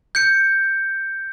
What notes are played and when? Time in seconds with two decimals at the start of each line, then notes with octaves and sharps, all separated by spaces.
0.15 G6 C#7